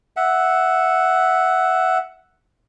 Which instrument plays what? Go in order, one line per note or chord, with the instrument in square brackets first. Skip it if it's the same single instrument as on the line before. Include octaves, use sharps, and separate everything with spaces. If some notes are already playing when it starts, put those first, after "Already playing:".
[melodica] E5 F#5